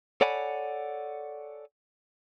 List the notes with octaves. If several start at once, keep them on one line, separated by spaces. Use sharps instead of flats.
A4 C#5 D5 F#5 G#5 B5